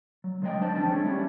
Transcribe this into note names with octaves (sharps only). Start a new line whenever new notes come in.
F#3
D3 F#3 G#3 B4 D#5 G5
D4 B4 C5 A5
E2 F3 C#4 D4 G5 A5
G#3 G#4 A4 C#5
G3 B3 C#4 E4